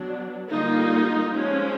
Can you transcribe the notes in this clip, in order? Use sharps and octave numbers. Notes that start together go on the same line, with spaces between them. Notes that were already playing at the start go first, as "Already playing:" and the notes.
Already playing: F#3 B3 D4
D3 G3 A#3 D#4 F4
F3 G#3 C#4